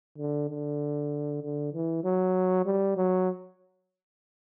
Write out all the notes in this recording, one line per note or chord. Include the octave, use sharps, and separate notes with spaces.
D3
D3
D3
E3
F#3
G3
F#3